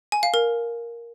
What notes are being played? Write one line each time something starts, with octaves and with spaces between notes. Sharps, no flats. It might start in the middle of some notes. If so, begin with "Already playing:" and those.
G#5
F5
A#4